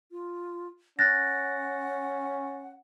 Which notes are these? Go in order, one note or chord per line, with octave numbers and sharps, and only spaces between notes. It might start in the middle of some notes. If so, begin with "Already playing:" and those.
F4
C#4 F#5 F#6 A6 A#6